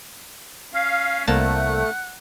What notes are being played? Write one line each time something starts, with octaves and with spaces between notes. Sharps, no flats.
C#4 F5
C2 A3 A#3 F#5 A5